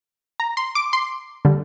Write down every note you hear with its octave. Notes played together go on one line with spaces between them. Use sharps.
A#5
C6
D6
C6
D3 G3